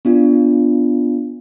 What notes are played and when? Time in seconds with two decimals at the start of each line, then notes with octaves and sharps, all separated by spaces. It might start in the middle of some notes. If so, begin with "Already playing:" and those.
0.05 B3 D4 F4